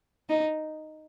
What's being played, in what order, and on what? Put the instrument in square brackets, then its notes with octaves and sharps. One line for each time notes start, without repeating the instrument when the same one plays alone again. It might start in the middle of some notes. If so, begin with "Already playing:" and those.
[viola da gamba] D#4